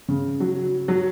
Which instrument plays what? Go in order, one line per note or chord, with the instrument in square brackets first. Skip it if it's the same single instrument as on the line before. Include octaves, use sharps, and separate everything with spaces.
[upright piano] C#3
F#3
F#3